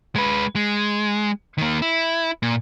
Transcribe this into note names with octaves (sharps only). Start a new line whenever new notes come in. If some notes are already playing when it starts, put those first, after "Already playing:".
G#3 B4
G#3
D#3 A#3
E4
A#2